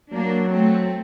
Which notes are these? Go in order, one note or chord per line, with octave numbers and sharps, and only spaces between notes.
F#3 A#3 D4
A3 C4